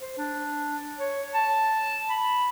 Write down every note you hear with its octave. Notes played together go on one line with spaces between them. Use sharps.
C5
D4
C#5
A5
B5